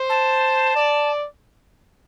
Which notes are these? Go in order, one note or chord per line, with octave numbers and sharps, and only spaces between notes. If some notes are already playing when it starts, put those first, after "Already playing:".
Already playing: C5
A5
D5